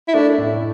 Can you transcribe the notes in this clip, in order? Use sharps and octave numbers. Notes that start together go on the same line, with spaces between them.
E4
A3 D4
A2